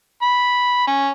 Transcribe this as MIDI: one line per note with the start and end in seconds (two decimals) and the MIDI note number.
0.22 0.83 83
0.88 1.09 61